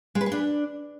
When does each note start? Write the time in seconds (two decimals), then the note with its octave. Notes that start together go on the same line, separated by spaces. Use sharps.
0.15 G#3
0.21 B4
0.26 G#4
0.32 D4